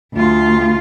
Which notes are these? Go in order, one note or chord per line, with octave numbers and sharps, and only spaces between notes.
D2 F4